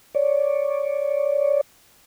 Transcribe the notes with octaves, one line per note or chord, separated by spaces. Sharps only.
C#5 D5